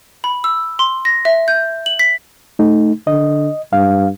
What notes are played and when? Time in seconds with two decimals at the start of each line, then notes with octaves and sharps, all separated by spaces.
0.24 B5
0.44 E6
0.79 C6
1.05 A#6
1.25 E5
1.48 G6
1.86 F#7
1.99 B6
2.59 A3 D#4
3.07 D3 D#5
3.73 G2 F5